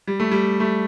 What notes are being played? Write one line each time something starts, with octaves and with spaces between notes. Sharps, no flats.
G3
A3
G3
A3